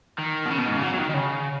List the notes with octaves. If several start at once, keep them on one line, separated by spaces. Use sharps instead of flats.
D#3
B2
C#3
B2
G#2
C#3
F#3
F#3
D#3
D#3
C#3